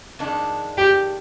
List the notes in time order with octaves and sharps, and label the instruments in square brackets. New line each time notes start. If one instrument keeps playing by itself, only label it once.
[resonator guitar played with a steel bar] F2 D#3 G#3 D4
[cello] G4